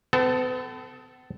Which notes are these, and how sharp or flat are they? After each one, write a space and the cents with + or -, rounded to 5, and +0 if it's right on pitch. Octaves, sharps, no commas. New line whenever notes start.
B3 +45 A4 +0